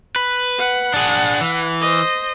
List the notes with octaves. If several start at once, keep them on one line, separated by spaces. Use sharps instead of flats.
B4
F#5
D4 G#4
E3
C5 D#5